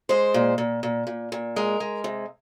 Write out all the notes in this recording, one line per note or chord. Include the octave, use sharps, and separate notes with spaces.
G#3 C5
A#2
A#2
A#2
A#2
A#2
G#3 A#4
G#3
C3